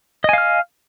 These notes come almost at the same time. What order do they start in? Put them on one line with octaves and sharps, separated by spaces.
D#5 G#5 F5 F6